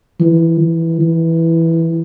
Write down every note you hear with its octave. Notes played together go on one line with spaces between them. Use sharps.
E3
E3
E3